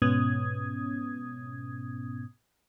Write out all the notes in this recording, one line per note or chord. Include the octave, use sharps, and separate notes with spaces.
G#2 B2 B3 C#4 D#6 G#6